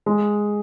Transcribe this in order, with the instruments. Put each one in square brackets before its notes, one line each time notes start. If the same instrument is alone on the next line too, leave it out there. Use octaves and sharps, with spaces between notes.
[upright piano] G#3